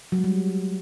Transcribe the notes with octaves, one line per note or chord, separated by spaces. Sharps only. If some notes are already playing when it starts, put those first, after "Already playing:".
F#3
G#3
G3